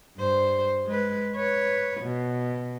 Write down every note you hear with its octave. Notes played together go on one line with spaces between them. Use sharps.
G2 C5
G#3 B4
B4 C#5
B2